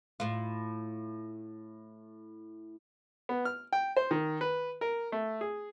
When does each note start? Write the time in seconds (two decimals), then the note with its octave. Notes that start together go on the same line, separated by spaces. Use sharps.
0.20 A2 F4
3.29 B3
3.45 F6
3.73 G5
3.97 C5
4.11 D#3
4.41 B4
4.81 A#4
5.12 A3
5.41 G#4